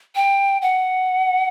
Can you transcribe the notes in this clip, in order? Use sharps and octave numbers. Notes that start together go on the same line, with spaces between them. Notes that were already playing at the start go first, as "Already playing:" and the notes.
G5
F#5